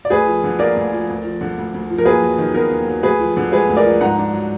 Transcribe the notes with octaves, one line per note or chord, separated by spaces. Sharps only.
D5
D2 G#4 B4
F3
D3
A#3 A#4 D5
D2
F3
D2
F3
D3
D2
D2
F3
A#4
D#2 G#4 B4
F#3
D#3
B3 A#4
D#2
F#3
D2 G#4 B4
F3
D3
G#3 G#4 B4
D2
A#4 D5
F3
G#2 F#5 A#5
D4
F#3